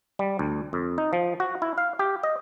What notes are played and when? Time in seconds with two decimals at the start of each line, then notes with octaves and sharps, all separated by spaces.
0.19 G3
0.39 D2
0.73 F2
0.98 D#4
1.13 F3
1.40 F#4
1.62 E4
1.78 F5
1.99 G4
2.23 D#5